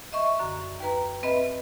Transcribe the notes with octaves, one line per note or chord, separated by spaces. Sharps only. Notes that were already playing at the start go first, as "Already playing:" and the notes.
D#5 E5 C#6
F#2 D3
D#2 B4 A#5
C4 B4 D#5 E5 B5